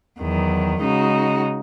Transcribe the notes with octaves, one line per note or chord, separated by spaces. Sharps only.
E2 D#3 F#3
C#3 G#3 D#4 F#4